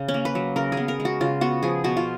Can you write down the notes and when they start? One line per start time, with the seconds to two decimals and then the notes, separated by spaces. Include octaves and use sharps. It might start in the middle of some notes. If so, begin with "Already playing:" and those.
Already playing: C#3
0.08 C#4
0.14 A#3
0.25 B4
0.35 F#3
0.56 C#3 A#4
0.72 G#4
0.77 B3
0.88 A#4
1.00 G#3
1.05 F#4
1.21 C#3 F4
1.41 B3 F#4
1.63 F3 G#4
1.84 B2 F#4
1.97 F4